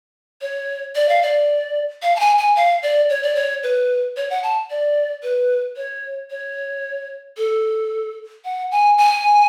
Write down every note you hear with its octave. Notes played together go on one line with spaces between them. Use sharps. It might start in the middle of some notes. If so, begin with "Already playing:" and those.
C#5
D5
F5
D5
F5
A5
G#5
G#5
F5
D5
C#5
D5
C#5
B4
C#5
F#5
A5
D5
B4
C#5
C#5
A4
F#5
G#5
G#5